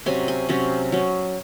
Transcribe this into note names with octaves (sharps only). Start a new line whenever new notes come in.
C3 F#3 C#4 G#5
G#5
C3 F#3 C#4
F#3 C#4